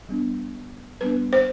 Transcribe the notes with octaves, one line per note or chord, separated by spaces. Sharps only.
G3 B3 D4
G3 B3 D4 B4
C5